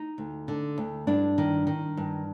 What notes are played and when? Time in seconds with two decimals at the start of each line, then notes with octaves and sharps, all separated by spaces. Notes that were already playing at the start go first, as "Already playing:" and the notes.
Already playing: D#4
0.18 D2
0.48 D3
0.78 D2
1.07 G2 D4
1.38 D#3
1.67 D#3
1.97 G2